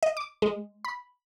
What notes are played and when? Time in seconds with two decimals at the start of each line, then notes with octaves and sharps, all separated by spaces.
0.03 D#5
0.17 D6
0.42 G#3
0.85 B5